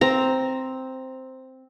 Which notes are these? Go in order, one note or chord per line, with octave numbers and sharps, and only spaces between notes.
C4 A#5